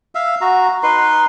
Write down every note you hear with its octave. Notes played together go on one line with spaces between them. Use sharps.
E5 F5
F#4 A#5
D#4 B4 C6